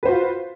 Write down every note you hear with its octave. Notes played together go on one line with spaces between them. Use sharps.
F4 F#4 B4 C5